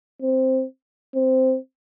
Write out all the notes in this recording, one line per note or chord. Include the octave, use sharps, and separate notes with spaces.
C4
C4